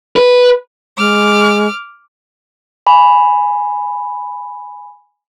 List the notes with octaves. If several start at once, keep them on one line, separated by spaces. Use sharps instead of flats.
B4
G#3 D6 F6
G#5 B5